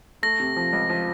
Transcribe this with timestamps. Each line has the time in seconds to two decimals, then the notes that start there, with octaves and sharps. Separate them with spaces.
0.23 A3 A#6
0.40 C3
0.57 F3
0.73 C#2
0.90 F3